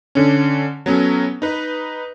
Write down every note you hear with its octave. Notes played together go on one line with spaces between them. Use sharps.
D3 C#4
F#3 B3 C#4 A4
D#4 B4